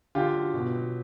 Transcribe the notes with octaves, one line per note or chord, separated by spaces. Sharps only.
D3 F4 G4
F#3
B2
F#3